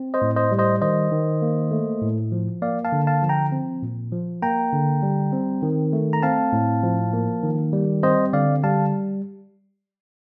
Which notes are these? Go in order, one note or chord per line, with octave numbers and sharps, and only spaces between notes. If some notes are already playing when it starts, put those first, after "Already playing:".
Already playing: C4
C5 D#5
A2
C5 D#5
G3
C5 D#5
D#3 C5 D#5
D#3
A#3
A3
A2
F3
A#3 D5 F5
F5 A5
D3
F5 A5
F3
G5 A#5
C4
A#2
F3
A#3 G5 A#5
D3
G3
C4
D#3
A3
A#5
C4 F5 A5
A2
F3
A#3
D#3
G3
C4 C5 D#5
D3 D5 F5
G3 F5 A5